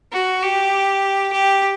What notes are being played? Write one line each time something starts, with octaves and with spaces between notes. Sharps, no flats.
F#4
G4
G4